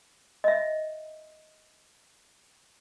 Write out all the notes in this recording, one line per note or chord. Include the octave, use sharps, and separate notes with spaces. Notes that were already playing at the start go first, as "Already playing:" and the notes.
D#5 E5